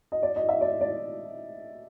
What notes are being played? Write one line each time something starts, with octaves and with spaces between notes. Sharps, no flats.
D#5
D5
D#5
E5
D5
D5